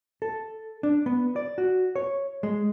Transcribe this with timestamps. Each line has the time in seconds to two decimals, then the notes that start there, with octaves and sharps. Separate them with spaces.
0.22 A4
0.83 D4
1.06 B3
1.36 D5
1.58 F#4
1.96 C#5
2.43 G#3